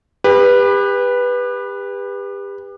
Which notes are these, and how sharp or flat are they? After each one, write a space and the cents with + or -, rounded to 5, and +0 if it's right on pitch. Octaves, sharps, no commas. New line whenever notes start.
G4 +35 B4 -5